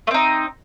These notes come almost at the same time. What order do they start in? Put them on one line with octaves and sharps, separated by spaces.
A3 C4 D#4